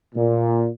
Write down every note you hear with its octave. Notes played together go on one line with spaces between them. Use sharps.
A#2